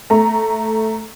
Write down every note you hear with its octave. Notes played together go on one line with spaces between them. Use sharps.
A3 A#5